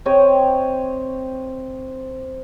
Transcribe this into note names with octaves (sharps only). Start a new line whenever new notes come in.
C4 C#5 D#5 G5